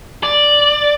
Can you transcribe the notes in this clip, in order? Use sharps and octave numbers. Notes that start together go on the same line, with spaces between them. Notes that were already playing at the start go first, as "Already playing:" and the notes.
D5